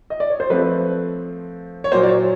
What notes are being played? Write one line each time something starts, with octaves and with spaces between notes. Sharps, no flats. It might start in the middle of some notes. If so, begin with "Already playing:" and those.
D#5
D5
C#5
C5
F3 A3 C4 B4
C#5
A#2 F#3 A#3 C5
D5
C#5